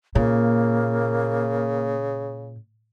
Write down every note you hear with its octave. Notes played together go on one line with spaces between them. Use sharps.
A#2 C#3 A#3